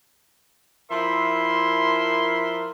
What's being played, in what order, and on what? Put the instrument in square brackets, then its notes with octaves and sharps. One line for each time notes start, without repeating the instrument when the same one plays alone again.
[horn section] F3 E4 A#4 E5 C6